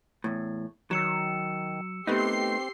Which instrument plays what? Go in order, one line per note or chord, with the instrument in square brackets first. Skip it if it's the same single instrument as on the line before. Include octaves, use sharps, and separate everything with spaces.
[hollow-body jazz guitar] E2 A2
[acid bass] D#3 [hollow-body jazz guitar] F#3 [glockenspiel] E6 C#7 E7
[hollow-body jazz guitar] A3 B3 D#4 [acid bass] C4 [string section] G4 C6 C7